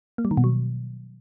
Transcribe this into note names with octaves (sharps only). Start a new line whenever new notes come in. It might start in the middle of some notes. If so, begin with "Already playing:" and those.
A#3
G3
D#3
B2
F#3